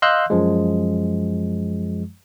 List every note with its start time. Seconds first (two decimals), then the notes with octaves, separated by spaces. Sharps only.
0.02 D#5 F5 C6 E6 F#6 G6
0.30 F#2 F3 G#3